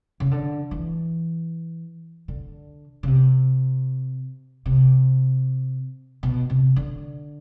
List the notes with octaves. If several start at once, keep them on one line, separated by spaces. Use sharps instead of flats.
C#3
D3
E3
D3
C#3
C3
C3
B2
C3
D3